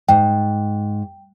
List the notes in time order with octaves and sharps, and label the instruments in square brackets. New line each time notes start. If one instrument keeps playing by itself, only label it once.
[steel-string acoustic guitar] G#2 [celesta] G5